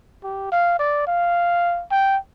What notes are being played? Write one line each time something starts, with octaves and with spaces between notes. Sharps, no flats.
G4
F5
D5
F5
G5